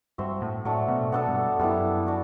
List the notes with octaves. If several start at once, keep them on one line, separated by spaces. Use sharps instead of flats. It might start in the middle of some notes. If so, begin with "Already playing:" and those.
G2 C4 F#4 C5 E5
A2
A2 F#3 A3 D4
B2
B2 B3 D4 A4
G2
F#2 G3 B3 E4
D4 F#4